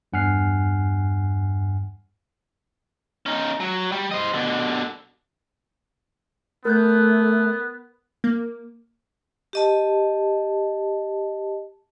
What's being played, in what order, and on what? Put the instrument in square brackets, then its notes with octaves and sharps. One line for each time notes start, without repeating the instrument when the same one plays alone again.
[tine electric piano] E2 G2 F#5 G#5 F6 C7
[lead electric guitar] C#4 D#4
F#3
G3
C5 D#5
B2 D3
[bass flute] A3 [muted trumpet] B3 [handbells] A#4 F#6 G6
[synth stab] A#3
[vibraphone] G4 D#5 A5